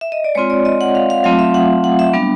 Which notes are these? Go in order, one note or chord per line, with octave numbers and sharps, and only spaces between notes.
E5
D#5
D5
G#3 C4 F4 C#5
D5
D#5
F#5
F5
F5
F#3 A3 C4 F4 F5
E5
F#5
F#5
E5
G3 B3 D4